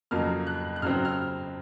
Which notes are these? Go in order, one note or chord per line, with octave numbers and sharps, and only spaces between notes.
F2 C#3 F#3 A#3 F6
F#6
F#6
C#3 F#3 C4 F6
F6